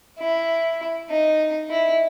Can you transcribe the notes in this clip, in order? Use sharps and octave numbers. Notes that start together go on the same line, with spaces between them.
E4
D#4
E4